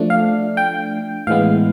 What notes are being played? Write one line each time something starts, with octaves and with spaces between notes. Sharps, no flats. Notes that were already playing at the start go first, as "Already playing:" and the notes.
Already playing: F3 A3 D4
F5
G5
A2 E3 G#3 B3 F5